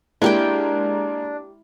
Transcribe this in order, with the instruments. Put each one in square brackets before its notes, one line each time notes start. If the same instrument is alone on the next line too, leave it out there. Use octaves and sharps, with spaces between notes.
[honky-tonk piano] G#3 A#3 [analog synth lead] D4 [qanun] E4 G4 G5